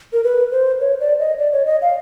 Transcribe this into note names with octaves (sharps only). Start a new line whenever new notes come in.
A#4
B4
C5
C#5
D5
D#5
D5
C#5
D#5
F5